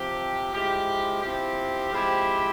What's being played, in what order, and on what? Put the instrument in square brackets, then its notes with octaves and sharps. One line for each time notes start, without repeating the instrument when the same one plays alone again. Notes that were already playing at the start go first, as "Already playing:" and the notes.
Already playing: [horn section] C3 F3 C4 G4
F3 G#3 E4 G4
F3 C4 E4 G4
F3 G#3 C4 E4 G4